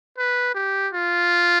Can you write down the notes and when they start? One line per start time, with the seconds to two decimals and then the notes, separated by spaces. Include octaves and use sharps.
0.18 B4
0.55 G4
0.93 F4